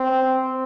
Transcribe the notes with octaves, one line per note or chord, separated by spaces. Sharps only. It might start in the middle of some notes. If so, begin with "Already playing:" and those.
Already playing: C4